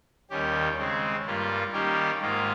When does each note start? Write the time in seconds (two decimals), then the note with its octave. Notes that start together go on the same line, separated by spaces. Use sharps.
0.30 D#2 D#3 G3 C#4 G4
0.78 C#3 G#3 C4
1.25 G2 G3 A#3 F4
1.73 D#3 G3 A#3 C#4 G4
2.20 G#2 D#3 A#3 F4